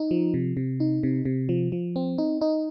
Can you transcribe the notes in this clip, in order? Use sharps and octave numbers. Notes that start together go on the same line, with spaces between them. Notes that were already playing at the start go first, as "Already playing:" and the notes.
Already playing: D#4
F3
C3
C3
D#4
C3
C3
F3
F3
C4
D#4
D#4